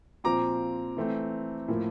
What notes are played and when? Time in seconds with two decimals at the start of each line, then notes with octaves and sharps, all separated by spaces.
0.24 A#2 F3 C4 A#5 D6
0.97 E3 A3 C4
1.68 A2 F3 A#3